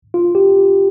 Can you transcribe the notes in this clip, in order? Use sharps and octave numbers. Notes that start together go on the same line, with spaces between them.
F4
G4